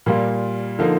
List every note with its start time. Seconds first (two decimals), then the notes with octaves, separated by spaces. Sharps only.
0.06 A#2 G3 A#3 F4
0.79 D3 F3 A#3 D#4